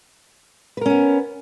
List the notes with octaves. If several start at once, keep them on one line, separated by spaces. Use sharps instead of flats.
B3 C#4 A#4 B4